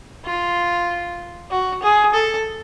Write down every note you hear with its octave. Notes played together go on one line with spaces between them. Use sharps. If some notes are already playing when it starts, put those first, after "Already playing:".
F4
F#4
G#4
A4